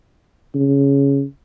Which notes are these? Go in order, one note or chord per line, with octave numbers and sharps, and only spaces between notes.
C#3